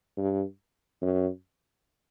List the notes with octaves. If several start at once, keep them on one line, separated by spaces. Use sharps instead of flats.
G2
F#2